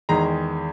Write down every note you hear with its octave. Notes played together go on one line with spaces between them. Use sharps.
E2 D#3 G#3 A#5